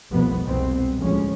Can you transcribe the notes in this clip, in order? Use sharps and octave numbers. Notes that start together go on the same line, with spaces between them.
F1 C2 F2 B2 F3 B3
C2 B2 G#3 B3 C4
D2 A2 F3 G#3 C#4